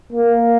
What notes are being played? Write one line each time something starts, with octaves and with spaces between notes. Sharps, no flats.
A#3